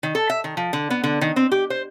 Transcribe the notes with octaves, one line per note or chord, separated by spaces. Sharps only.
D#3
A4
E5
D#3
F3
D3
B3
D3
D#3
C4
G4
C5